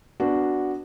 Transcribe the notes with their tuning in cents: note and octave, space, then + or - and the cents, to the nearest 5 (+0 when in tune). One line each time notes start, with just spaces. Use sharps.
B3 +0 D4 +0 F#4 +0